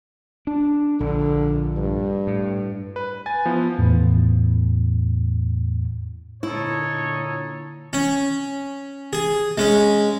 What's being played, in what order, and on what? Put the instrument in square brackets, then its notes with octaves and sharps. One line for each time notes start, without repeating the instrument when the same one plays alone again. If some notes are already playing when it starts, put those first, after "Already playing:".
[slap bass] D4
[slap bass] A#1 [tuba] D3
[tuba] G2
[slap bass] A2
[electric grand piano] B4
G#5 A6
F3 B3 E4
[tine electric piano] E2 A2
[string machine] A#2 D3 [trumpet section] D#4 A4 C#5 [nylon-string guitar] E4
[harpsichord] C#4
G#4
G#3 C#4